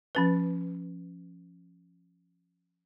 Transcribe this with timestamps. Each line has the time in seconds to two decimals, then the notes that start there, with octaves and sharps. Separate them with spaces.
0.15 F3 C#4 B4